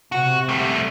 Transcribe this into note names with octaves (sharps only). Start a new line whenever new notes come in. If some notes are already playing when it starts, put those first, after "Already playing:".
C3 F#4
G3 A3